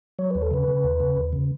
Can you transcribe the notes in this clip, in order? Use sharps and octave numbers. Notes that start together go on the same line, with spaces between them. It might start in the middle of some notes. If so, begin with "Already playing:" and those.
F#3 C#5
D#2 B4
A4
C#3 B4
C#3
D#2
C#3
D#2
C#3